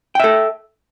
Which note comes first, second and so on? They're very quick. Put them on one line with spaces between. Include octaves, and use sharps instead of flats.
G5 E5 A4